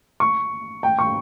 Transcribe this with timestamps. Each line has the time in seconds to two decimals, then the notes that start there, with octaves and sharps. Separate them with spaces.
0.20 C#6
0.83 G5
0.99 C#6